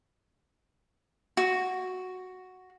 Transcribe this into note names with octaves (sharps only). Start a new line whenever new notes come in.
F#4